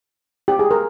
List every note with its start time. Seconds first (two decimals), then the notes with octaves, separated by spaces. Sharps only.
0.48 G4
0.59 G#4
0.71 A#4